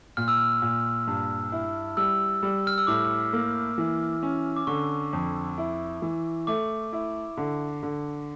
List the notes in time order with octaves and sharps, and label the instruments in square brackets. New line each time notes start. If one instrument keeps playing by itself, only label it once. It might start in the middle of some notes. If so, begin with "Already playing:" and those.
[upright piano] A#2 [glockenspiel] F6
[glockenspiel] E6
F6
[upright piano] A#2
G2
E4
[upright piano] G3 [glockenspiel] E6
[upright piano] G3
[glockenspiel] F6
E6
[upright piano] A2 [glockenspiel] D6
[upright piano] A#3
E3
C#4
[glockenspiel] D6
[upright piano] D3 [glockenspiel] C#6
[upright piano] F2
E4
E3
[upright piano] A3 [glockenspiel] D6
[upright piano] E4
D3
D3